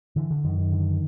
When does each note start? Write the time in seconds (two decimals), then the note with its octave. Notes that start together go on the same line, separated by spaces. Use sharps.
0.16 D3 E3
0.31 D3
0.44 F#2 D#3
0.58 D#3
0.72 D3